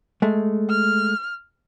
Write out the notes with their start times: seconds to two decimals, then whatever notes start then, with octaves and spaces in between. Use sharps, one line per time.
0.22 G#3 A3
0.70 F6